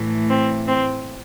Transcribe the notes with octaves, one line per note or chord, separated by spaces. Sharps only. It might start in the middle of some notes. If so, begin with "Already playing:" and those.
Already playing: A2 E3 A3
C4
C4